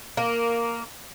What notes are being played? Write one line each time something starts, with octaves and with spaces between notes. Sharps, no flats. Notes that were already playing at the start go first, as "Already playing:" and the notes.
A#3